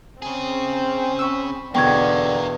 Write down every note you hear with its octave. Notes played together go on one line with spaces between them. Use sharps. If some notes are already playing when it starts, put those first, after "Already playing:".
C#3 C4 G#4
B5 C#6 E6
E2 B2 D3 A#3 G4 G5 C#6 G#6